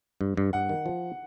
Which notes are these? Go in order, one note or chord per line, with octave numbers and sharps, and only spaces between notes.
G2
G2
G2 F#5
D#3
F3